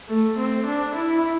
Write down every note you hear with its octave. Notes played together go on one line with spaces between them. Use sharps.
A3
C4
D4
E4